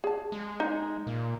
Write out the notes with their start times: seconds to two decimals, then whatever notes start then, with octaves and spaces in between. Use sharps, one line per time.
0.04 G#4 A5
0.32 G#3
0.60 D#4
1.07 A#2